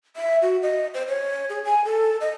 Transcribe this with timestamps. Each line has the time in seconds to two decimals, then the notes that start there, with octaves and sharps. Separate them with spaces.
0.16 E5
0.42 F#4
0.62 D#5
0.94 C5
1.08 C#5
1.49 G#4
1.65 G#5
1.85 A4
2.21 D#5